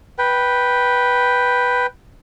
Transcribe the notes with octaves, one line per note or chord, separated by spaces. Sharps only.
B4 G5